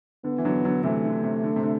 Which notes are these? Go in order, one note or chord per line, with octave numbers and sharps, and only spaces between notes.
D3 B3
E3
D3 F#3
D3 F#3
C3 E3 A3
D3
C3
D3
C3
D3